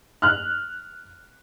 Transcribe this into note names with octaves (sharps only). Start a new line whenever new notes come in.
F6 F#6